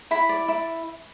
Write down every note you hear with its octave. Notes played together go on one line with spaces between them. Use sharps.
E4 B5
D5
E4